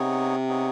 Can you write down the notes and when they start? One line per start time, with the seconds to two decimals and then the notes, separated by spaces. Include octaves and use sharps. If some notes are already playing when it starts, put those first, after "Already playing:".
Already playing: C3 B3 D#4 G#4 C#5
0.48 B3 D#4 G#4 C#5